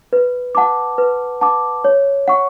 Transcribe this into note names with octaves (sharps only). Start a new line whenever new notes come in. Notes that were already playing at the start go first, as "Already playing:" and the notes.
B4
F#5 A5 D6
B4
F#5 A5 D6
C#5
F#5 C#6